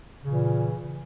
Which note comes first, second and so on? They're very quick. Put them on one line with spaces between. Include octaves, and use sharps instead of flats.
C#3 A#2 E3